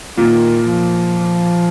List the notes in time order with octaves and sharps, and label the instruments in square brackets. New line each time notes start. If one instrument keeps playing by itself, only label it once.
[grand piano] A#2 A#3 F4 [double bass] D#3
[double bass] F3